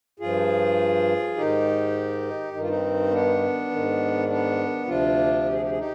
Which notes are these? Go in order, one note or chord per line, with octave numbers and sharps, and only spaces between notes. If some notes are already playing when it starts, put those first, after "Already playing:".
G2 F3 F4 G#4
G#2 D#3 D#4 G4
G2 D#3 D#4
F4
C4 D#4
B3 D4
G#2 D#3
B3 D4
D2 C3 F3 D4 F4
G4
G#4
G4
G#4
D#4 G4